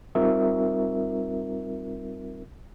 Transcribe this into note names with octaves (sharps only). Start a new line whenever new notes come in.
G3 C4 D#4 F4 A#4 E5